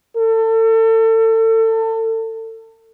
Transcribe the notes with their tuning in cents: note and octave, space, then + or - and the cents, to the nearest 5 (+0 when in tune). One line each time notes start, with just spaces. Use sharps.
A4 +30